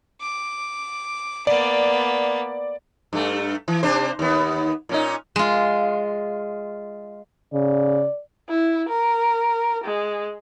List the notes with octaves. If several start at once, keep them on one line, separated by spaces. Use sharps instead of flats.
D6
A#3 B3 D5
G2 A3
E3
C3 D4 C5
D#2 B3
A#2 C#4 D#4
G#3 F4
C#3 D5
E4
A#4
G#3